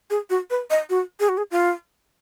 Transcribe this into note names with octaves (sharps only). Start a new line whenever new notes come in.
G#4
F#4
B4
D#5
F#4
G#4
F#4
G#4
F4